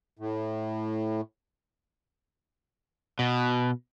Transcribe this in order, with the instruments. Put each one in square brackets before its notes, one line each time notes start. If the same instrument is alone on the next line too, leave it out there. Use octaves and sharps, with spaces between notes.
[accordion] A2
[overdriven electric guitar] B2